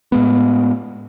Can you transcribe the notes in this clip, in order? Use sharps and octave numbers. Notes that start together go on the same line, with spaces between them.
A2 G#3 B3